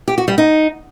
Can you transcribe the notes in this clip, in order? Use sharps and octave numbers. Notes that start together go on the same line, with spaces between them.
G4
F#4
G3
D#4